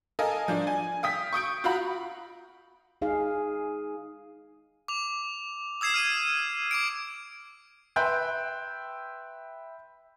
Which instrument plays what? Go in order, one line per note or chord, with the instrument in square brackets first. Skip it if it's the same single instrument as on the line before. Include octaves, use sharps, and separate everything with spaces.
[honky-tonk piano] A4 A#4 D#5 F5 G#5
F3 D4 D5
G#5
F5 G5 D#6 G6 B6
C#6 D#6 G6 D7
F4 F#4 F5 F#5 A#5 B5
[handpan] D#4 G#4 F5
[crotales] D6 F7
D#6 E6 G#6 C7 E7
F6 D#7
D6 G#6 D7
[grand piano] B4 E5 G5 C6 F#6 G6